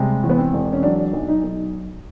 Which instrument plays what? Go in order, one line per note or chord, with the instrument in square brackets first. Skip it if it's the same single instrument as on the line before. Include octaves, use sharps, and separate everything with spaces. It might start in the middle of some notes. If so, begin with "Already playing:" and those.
Already playing: [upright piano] C3 G3 G#3
E2
B3
C4
E1
C#4
F#3 D4
B1
D#4
B1